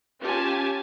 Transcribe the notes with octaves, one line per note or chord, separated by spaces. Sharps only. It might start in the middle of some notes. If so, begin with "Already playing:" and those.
C#4 F4 G4 G#5 A5